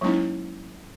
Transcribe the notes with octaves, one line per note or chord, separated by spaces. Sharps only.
F#3 G#3 A#3 C#4 D#4 E4